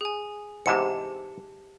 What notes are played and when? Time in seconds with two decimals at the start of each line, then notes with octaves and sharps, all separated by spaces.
0.01 G#4 G#5
0.66 E2 G#2 C3 G4 A5 C#7